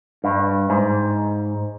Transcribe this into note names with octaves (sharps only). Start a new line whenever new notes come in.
G2
G#2